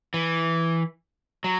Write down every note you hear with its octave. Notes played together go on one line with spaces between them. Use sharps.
E3
F#3